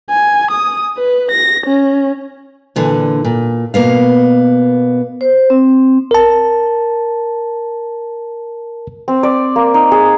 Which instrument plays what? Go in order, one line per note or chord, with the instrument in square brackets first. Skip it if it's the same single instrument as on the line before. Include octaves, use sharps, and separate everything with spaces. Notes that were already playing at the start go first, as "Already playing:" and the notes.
[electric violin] G#5
D#6
B4
A#6
C#4
[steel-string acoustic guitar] A#2 D3 E3
A#2
B2 A#3 B3 F5
[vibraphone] C5
C4
[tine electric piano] A#4 A5
[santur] C4
D5
A#3
D#4
G#4